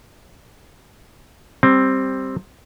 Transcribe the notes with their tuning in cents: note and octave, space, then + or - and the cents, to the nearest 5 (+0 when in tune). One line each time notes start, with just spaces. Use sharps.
G3 +5 C4 +10